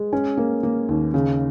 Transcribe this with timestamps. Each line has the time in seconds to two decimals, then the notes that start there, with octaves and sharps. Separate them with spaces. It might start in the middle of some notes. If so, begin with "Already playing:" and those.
Already playing: G#3
0.13 C#4
0.37 A#3
0.63 A#3
0.89 D#2
1.14 C#3